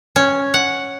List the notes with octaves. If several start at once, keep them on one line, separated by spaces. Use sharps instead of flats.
C#4
F#5